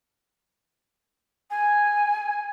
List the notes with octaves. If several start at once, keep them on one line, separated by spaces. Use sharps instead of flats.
G#5